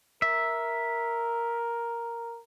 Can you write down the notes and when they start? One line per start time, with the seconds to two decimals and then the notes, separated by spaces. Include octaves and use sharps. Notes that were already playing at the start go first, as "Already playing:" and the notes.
0.22 A#4 E5